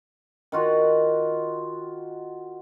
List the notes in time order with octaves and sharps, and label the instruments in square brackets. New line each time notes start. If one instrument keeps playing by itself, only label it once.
[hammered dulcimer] D#3 F4 F#4